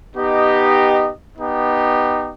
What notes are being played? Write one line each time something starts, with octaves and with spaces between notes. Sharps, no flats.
B3 D#4 G4 D#5
B3 D#4 G4